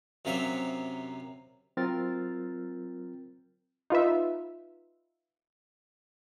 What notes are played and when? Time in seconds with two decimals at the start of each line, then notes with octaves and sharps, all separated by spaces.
0.25 F#2 C3 F#3 A#3 E5
1.77 F#3 C4 F4 A#4 F6 A6
3.90 D#4 F4 B4 E5